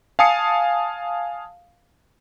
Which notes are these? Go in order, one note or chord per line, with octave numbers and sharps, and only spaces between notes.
F5 G#5 A5 D#6 C7 C#7